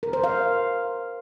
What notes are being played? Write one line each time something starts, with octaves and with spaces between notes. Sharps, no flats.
A#4
C5
F5